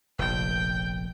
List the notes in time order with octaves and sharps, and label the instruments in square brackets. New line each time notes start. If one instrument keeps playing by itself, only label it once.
[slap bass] F1 A#1 [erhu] G5